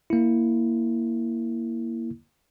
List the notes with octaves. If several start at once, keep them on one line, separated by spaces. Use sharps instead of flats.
A#3 E4